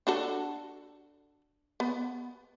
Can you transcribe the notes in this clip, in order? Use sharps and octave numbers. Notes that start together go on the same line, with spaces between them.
D4 F#4 A4
B3